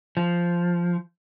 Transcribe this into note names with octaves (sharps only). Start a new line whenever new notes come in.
F3